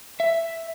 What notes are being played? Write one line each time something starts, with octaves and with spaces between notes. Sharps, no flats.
E5